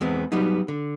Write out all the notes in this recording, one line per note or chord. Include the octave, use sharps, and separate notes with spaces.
E2 G#3 B3 C4
F#3 G3 B3 D#4
D3